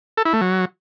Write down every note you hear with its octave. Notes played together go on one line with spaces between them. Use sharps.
A4
E4
A3
F#3